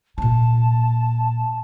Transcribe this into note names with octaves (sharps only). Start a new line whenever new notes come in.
A#2 A#3 A5